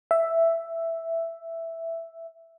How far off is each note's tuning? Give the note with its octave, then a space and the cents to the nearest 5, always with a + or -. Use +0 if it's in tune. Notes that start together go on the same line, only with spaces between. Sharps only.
E5 +5